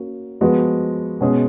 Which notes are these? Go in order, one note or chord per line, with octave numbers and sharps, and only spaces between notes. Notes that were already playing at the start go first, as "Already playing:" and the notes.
Already playing: A#3 C#4 F#4
F3 G#3 B3 F#4 B4
B2 G#3 C#4 G#4